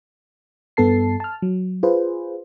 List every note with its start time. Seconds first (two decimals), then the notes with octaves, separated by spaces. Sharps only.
0.77 G2 B3 A4 A5 C7
1.20 A5 F6
1.42 F#3
1.83 F4 G#4 B4 C5